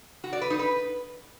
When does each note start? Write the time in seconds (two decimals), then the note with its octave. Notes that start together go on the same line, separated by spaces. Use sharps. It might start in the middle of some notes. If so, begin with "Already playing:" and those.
0.24 F#4
0.33 D5
0.41 B4
0.50 D#4
0.59 B4